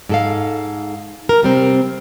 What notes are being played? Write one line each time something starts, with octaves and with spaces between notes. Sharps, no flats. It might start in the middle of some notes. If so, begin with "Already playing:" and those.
G#2 A4 F5
A#4
C3 G3 C4